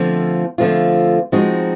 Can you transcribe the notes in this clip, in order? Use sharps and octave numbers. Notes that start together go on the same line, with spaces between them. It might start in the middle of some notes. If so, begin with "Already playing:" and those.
Already playing: D3 F3 A3 C4 F4
D3 F3 A3 C4 F4
F3 G#3 C4 D#4 F#4